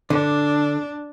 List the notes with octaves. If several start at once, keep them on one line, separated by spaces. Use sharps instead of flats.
D3 D4